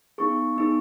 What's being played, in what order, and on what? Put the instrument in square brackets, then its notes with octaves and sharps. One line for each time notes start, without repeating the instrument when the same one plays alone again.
[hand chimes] B3 D#4 G#4 C#6
B3 D#4 G#4